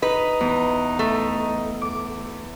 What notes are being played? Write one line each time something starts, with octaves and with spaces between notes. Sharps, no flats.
D#4 B4
E2
A3
D6